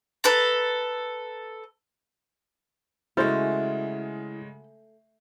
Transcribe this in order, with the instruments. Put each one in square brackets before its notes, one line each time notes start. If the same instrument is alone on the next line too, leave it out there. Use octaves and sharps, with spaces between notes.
[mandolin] A4 B4 A#5
[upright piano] C#3 G#3 [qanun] A3 [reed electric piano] E4 F6 A6 [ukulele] F#4 C5